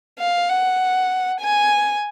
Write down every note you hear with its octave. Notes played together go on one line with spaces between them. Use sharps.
F5
F#5
G#5